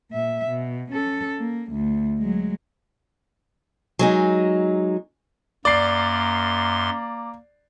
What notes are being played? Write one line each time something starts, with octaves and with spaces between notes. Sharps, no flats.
A#2 E5
B2
C#4 A4
A#3
D2
F#3 G#3
F#3 G#3 D#4
F#2 A#3 D5 C6 C7